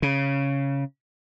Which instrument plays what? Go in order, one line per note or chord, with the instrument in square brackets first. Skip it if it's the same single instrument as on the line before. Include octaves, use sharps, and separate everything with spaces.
[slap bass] C#3